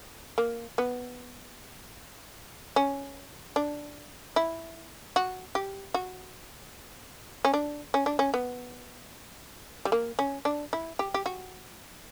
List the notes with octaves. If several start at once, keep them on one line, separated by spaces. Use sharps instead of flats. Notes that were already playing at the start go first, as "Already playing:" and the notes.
A#3
B3
C#4
D4
E4
F#4
G4
F#4
C#4
D4
C#4
D4
C#4
B3
G3
A#3
C#4
D4
E4
G4
G4
F#4